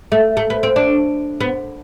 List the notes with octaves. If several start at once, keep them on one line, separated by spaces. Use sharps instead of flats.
A3
A3
B3
C4
D4
B3